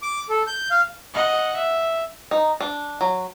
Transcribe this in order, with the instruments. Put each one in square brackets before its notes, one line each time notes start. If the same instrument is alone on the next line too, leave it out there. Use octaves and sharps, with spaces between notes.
[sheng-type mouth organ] D6
A4
G6
F5
[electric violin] D#5 F#5
E5
[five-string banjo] D#4
D4
F#3